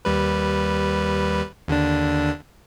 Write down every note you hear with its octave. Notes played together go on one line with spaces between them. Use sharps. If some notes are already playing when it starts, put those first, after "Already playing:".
D#2 G3 B4
D#2 D3 D4